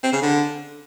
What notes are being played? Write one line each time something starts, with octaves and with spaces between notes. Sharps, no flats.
C4
C#3
D3